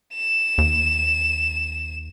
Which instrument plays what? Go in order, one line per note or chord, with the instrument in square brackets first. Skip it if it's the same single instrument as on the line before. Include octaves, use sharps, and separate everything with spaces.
[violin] E7
[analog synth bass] D#2